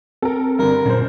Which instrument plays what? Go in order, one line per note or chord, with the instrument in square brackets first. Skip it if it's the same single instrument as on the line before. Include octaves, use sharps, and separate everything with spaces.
[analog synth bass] C4 [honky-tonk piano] A4 A#4
[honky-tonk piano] G2 D3 [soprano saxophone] A#4
[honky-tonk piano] F#2 C5 [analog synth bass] A#2